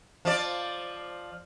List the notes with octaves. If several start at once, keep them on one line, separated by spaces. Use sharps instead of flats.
F3 D5